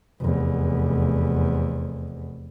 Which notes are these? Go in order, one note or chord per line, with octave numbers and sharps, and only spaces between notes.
F1 E2